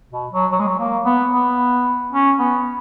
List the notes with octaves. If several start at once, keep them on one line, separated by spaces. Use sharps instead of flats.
B2
F#3
F#3
G#3
F#3
A#3
B3
B3
C#4
B3